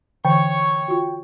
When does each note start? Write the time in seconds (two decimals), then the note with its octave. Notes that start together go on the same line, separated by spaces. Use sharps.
0.25 D3 E3 C#5 G5 C#6
0.88 F4 F#4